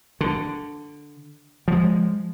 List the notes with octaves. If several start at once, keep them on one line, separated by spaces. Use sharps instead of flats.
D3
F3 G#3